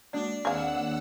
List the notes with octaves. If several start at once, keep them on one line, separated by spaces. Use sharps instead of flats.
G#3 A#3 D4 F#4
D#2 C4 G#4 F5 F#5 G#5 E6